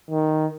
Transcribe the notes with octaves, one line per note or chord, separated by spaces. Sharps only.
D#3